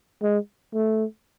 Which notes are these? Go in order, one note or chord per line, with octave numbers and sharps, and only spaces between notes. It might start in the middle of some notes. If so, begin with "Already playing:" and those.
G#3
A3